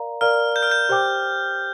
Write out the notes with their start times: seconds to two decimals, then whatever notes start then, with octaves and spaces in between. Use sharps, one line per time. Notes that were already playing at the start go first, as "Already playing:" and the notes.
Already playing: A#4 D5 F5 A#5
0.21 A#4 D5 F5 A#5 F6
0.56 G6
0.63 F6
0.72 G6
0.89 G4 C5 G5 D6